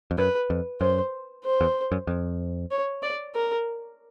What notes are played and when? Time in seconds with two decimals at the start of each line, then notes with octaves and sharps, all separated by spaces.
0.11 F2
0.18 F#2 B4
0.50 F2
0.81 F#2 C5
1.44 C5
1.61 E2
1.92 F#2
2.07 F2
2.71 C#5
3.03 D5
3.35 A#4